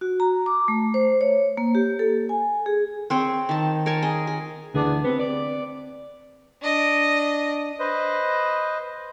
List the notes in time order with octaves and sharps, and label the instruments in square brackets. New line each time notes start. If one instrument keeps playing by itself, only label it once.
[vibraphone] F#4
A#5
D6
A3
C5
C#5
A#3
G4
A4
G#5
G#4
[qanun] C4 C5 C#5
D#3 A5
A#4 C#5 G#5 A5
G#4 D#5
G#4
[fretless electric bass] D2 D3 E3 [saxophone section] B3 D4 G#4
[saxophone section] C3 B3 [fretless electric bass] C4
[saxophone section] D5
[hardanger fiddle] D4 D#5
[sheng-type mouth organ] B4 C5 D#5